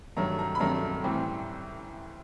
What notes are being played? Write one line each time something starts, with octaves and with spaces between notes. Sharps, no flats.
G2 D#3 F#3 A3 D4 A#5
A#5
B5
G2 D#3 F#3 A3 D4 A#5
A2 E3 G3 C4